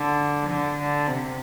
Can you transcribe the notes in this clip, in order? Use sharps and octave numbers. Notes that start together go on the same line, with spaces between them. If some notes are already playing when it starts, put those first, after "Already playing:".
Already playing: D3
D3
D3
C3